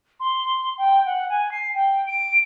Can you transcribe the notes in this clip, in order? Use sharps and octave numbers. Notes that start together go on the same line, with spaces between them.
C6
G5
F#5
G#5
C7
G5
D7